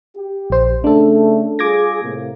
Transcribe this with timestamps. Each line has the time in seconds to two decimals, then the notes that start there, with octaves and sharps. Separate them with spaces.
0.17 G4
0.50 A#1 C5
0.84 C#3 A3 D4 A4
1.59 G3 F4 G#4 D6 G#6 A#6
2.02 A2 C3 A#3